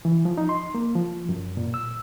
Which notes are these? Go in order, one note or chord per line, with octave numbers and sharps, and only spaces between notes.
E3
F3
D#4
C6
A#3
F3
F#2
A#2
E6